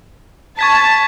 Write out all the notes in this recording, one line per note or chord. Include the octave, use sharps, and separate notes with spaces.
A5 C#6 G#6 B6